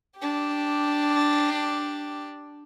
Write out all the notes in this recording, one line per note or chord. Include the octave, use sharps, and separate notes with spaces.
D4 G4